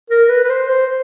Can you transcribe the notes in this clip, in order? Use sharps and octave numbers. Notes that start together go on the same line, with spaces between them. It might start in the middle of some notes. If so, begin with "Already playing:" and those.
A#4
B4
B4
C5
C5